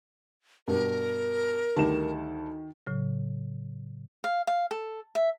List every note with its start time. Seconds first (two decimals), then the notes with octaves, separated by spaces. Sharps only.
0.68 G2 B2 G3 A#4
1.76 D2 D#3 G3 A5 E7
2.87 A2 C#3 F#3
4.24 F5
4.47 F5
4.71 A4
5.15 E5